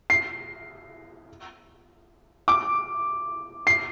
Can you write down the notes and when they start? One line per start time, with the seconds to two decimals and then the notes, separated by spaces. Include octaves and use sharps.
0.10 C7
2.48 D6
3.67 C7